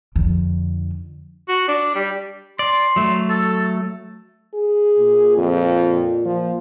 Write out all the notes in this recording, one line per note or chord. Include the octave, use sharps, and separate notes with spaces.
F2 D3
F#4
D4
G3
D5 C6
F#3 A3
A4
G#4
A#2
F2
F3